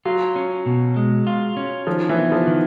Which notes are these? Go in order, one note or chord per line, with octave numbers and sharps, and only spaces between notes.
F#3 F4
C#4
B2
G#3
F4
C#4
D#3 F3
E3
B3
F3
D#3